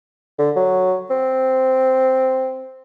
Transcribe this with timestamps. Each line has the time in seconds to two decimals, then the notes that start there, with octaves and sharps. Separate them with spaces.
0.38 D3
0.56 F#3
1.10 C4